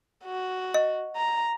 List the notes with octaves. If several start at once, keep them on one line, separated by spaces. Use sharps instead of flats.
F#4
D#5
A#5